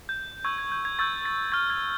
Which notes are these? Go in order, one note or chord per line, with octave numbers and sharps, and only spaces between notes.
G6
C#6 E6 G6 G#6
G#6
G6
G#6
C#6 E6 G6 A6
A6
C#6 F6 G#6
G#6